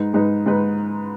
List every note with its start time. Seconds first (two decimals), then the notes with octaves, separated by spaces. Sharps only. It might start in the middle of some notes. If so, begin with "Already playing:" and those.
Already playing: G#2 G#3 D#4 B4
0.14 G#2 G#3 D#4 B4
0.46 G#2 G#3 D#4 B4